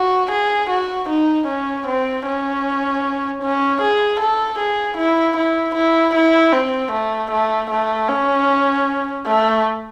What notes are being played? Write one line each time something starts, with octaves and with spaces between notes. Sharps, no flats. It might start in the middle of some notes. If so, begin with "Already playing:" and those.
Already playing: F#4
G#4
F#4
D#4
C#4
C4
C#4
C#4
G#4
A4
G#4
E4
E4
E4
E4
C4
A3
A3
A3
C#4
A3